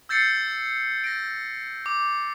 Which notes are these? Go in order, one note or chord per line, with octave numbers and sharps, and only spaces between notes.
E6 G6 A6 C7 C#7
A#6 D7
D6